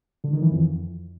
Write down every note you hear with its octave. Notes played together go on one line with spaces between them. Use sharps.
D3
D#3
E3
F2